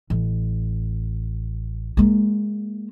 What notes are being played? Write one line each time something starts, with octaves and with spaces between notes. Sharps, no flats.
A1
G#3 A#3